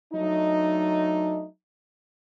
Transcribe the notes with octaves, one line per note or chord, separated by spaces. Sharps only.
F#3 A3 D4 D#4